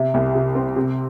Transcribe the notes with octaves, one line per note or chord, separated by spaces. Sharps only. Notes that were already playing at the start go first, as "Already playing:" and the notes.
Already playing: C3 E5
C2
C3
C4
C3